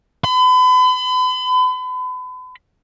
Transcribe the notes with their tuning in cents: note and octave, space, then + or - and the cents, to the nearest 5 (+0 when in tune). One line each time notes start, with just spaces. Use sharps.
B5 +40